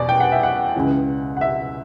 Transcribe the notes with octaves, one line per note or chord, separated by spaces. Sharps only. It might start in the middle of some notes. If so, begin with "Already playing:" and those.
Already playing: E2 B2 D5
G5
F#5
E5
F#5
C#2 C#3 E3
F#5
E5